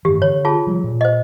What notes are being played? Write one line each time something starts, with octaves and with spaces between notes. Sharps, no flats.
G2 D#3 E3 G4
D3 C#5
F4 G#4 A5
F3 G3
A#2
C5 D#5